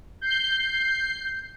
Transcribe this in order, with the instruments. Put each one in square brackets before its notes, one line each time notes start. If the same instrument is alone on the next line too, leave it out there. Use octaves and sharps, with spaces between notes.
[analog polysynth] G6 C7